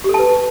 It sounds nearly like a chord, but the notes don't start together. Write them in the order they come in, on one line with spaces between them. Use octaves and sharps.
G4 A4 A5 B4